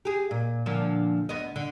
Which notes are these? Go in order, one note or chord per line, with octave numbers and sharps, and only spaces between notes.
G4 G#4
A#2
A#2 D3 F3
D2 B3 D#5
D3